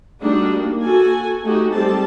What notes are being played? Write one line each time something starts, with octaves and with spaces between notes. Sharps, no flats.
G3 A3 D4 D#4 F#4
A#3
F#4 A4 G#5
A3 D#4 F#4 G4
G3 G#3 C4 G4 A4 A5